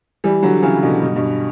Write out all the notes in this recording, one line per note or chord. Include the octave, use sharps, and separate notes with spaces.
E3 G3
D3 F#3
C#3 E3
B2 D3
G2 B2
G2 B2